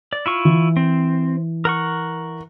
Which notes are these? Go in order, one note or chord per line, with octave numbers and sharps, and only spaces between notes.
D5
E4 F4 C#6
E3
C4
A#4 F#5 C#6